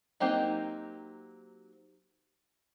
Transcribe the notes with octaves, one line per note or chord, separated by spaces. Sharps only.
F#3 A#3 C4 D#4 G4